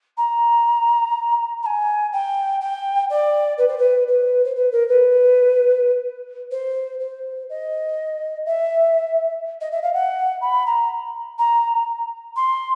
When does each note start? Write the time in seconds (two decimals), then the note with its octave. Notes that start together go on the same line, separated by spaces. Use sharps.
0.17 A#5
1.62 A#5
1.66 G#5
2.12 G5
2.61 G5
3.09 D5
3.58 B4
3.68 C5
3.78 B4
4.07 B4
4.44 C5
4.55 B4
4.71 A#4
4.88 B4
6.51 C5
6.99 C5
7.49 D#5
8.45 E5
9.60 D#5
9.71 E5
9.82 F5
9.93 F#5
10.41 B5
10.66 A#5
11.38 A#5
12.36 C6